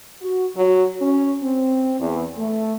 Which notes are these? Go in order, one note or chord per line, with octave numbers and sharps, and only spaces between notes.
F#4
F#3
C#4
C4
E2
A3